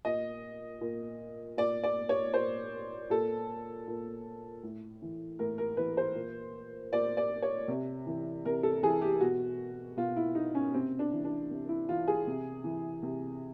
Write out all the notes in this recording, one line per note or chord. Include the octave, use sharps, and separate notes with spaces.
A#2 D#5
A#2
A#2 D5
D5
C#5
A#2 C5
A#2 A4
A#2
A2
E3
A2 A#4
A#4
E3 B4
C5
A#2
A#2 D5
D5
C#5
C3
E3
C3 A#4
A4
E3 G#4
G4
B2 F#4
B2 F4
E4
D#4
C#4
C3 C4
D4
E3
D4
C3
E4
E3 F4
G#4
C3
E3
C3